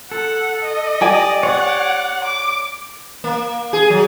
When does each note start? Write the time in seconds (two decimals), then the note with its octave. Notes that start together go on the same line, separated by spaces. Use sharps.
0.11 A4 F#5
0.63 D#5
1.01 G4 D5 G#5
1.43 C#5 F#5 C#6
2.25 D6
3.24 A#3
3.73 G#4
3.90 F#3